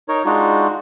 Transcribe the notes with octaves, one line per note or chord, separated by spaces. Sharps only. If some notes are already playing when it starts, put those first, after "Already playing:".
D#4 A#4 C#5
G#3 D4 D#4 F4 F#4